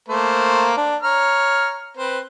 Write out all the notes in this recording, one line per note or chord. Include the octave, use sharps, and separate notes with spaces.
A3 A#3 C5
D4
C#5 A#5 F6
C4 B4 C5